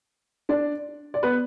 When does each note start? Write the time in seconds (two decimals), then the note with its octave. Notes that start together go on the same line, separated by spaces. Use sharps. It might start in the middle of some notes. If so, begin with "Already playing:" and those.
0.49 D4 D5
1.14 D5
1.23 B3 B4